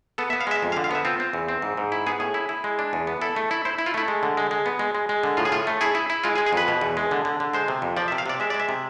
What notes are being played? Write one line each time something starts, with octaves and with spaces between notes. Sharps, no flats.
B3 A4
E5
B3
F5
G#3 E5
F2
F5
D3
F5
B3 E5
C4 F4
C4
E2
C4
G#2
G#2
E4
B3 G#4
A2 G#4
E4
E4
G#3
D4
E2
B3
E4 A4
A3
E4
E4 C5
E4
F4
A3 E4
G#3
D3
G#3
G#3
B3
G#3
G#3
G#3
D3
A2 F4
G#4
A2 F4
A3
E4 G#4
E4
E4
G#3 F4
G#3 G#4
G#4
F2 B4
B2
E2
G#3
D3
D3
D3
G#3 C5
C3
F2
F3 D5
E5
C3
F5
C3 D5
G#3 E5
G#3 D5
E5
C3